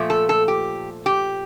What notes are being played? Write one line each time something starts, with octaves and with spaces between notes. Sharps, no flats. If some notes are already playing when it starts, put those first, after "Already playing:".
Already playing: A#2 F3 A3
A4
A4
G4
G4